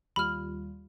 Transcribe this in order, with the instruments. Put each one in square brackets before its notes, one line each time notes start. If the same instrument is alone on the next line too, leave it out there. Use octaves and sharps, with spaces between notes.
[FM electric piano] D#2 G3 F4 [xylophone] B5 F6